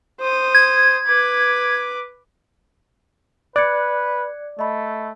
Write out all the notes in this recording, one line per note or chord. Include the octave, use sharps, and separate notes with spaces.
C5 D#6
G#6
B4 D6
B4 D5 F#6 G#6 C#7
A3 D#5 B5